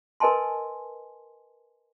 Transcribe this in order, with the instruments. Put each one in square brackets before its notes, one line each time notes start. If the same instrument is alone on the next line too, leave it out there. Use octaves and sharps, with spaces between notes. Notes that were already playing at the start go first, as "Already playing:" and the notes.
[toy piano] A#4 B4 D#5 G#5 A5 C6